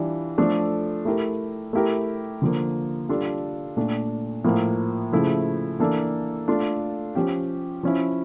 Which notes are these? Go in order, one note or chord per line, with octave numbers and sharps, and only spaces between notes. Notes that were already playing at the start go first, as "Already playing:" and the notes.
Already playing: E3 G3 D4 F4
F3 A3 D4 A4
A3 E4 G4 A#4
A3 E4 G4 A#4
D3 F3 A#3
G3 D4 F4 A4
A#2 A3 D4
A2 F3 A#3
C#3 F3 A3 E4
E3 A#3 D4 A4
A3 D4 F4 A4
F3 C#4 G4
F3 C#4 E4